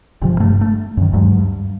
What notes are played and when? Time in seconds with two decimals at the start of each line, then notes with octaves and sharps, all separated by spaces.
0.22 G1 C3 F3
0.40 G2 A3
0.61 A3
0.97 F#2 D#3
1.13 D2 G2 F#3 G#3
1.39 G2